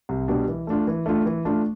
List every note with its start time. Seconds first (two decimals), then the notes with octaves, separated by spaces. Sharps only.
0.09 C2
0.28 B2 G3 D4
0.48 E3
0.67 A3 D4 F4
0.87 E3
1.06 A3 D4 F4
1.26 E3
1.45 A3 D4 F4